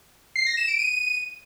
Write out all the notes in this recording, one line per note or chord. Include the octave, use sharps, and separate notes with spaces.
C7
A#6
E7
D7
D#7